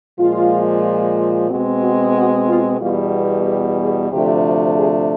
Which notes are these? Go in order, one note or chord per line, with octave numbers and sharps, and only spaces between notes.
A#2 F3 G#3 F4
B2 G#3 C4 F#4
F#4
F#4
F4
E2 B2 G3 F4
G4
G#4
D2 C3 F3 A3 D4 G4
G#4